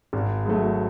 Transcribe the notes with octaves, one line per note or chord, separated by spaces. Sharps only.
G#1
G#2 F#3 A3